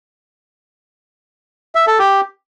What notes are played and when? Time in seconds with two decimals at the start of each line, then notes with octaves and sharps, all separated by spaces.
1.75 E5
1.87 A4
1.99 G4